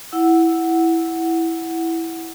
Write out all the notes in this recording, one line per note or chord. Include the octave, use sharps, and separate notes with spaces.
E4 F#5 E6